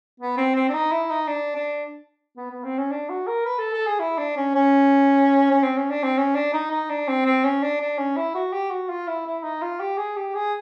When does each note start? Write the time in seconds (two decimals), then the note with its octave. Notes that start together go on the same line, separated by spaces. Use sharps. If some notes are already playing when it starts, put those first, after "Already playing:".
0.20 B3
0.37 C4
0.55 C4
0.69 D4
0.74 D#4
0.91 E4
1.10 D#4
1.28 D4
1.55 D4
2.37 B3
2.51 B3
2.64 C4
2.78 C#4
2.91 D4
3.09 F#4
3.27 A#4
3.45 B4
3.59 A4
3.73 A4
3.86 G#4
3.99 E4
4.18 D4
4.36 C#4
4.55 C#4
5.51 C#4
5.63 C4
5.77 C#4
5.90 D4
6.03 C4
6.18 C#4
6.35 D4
6.53 D#4
6.71 D#4
6.89 D4
7.08 C4
7.26 C4
7.44 C#4
7.62 D4
7.81 D4
7.98 C#4
8.17 E4
8.35 F#4
8.53 G4
8.71 F#4
8.89 F4
9.07 E4
9.26 E4
9.43 D#4
9.62 F4
9.80 G4
9.97 G#4
10.16 G4
10.34 G#4